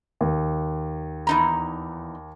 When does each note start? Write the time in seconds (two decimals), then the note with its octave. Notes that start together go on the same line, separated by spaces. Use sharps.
0.21 D#2
1.27 E2 D#4 A#5